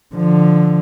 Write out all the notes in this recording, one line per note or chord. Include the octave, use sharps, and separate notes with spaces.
D3 F3